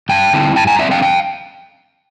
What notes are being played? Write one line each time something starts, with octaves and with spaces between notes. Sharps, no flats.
G2 G5 A5
D3 G3 C4 E4
G2 G5 A5
G#5 A#5
D3 G3 C4 E4 D5 E5
F5 G5
F5 G5